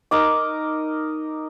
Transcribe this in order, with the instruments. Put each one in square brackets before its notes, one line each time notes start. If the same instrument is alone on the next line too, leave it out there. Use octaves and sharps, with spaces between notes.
[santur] D#4 A#4 D#5 D6